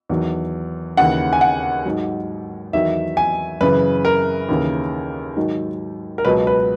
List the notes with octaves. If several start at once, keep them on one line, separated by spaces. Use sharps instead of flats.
E2 D#3 F#3
D#2 C#3 E3 F#5
G#5
F#5
G#2 F#3
E2 D#3 F#3 E5
G#5
F#2 C#3 E3 B4
A#4
D#2 C#3 E3
G#2 D#3 F#3
A#4
C#2 B2 F#3 B4
B4